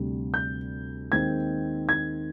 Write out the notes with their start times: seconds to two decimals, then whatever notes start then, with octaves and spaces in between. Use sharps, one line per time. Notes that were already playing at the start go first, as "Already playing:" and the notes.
Already playing: D2 C3 G3
0.34 G6
1.12 D#2 D#3 G#3 C4 G#6
1.89 G#6